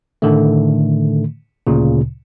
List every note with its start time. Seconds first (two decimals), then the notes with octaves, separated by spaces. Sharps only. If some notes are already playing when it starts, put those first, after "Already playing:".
0.22 A2 D3 D#3 A3
1.67 D2 A#2 C#3